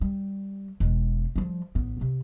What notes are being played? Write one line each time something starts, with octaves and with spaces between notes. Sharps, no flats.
G3
E1 G#3
F3 G3
A1 B3
C3